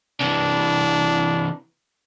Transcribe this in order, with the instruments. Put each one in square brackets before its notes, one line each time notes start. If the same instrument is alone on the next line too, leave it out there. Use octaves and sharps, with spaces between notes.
[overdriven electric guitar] C3 E3 [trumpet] D4